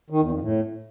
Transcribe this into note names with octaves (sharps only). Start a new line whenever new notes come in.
D#3
E2
F2
A2